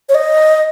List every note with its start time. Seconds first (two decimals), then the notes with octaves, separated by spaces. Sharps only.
0.09 C#5
0.15 D#5